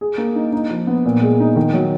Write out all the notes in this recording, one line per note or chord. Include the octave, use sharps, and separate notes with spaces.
G#4
A#3
D#4
D#4
F3
B3
A#2
G#3
D#4
D#3
F#3